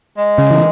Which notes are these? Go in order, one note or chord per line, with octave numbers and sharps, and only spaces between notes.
G#3
C#3
E3